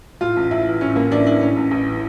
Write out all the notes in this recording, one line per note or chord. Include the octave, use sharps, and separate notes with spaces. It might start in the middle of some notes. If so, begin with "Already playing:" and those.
A2 F4
A1
A1 E4
E3
A2 C#4
A1 A#3
A1 D4
E3 D4
A2 C#4
A1
A1
E3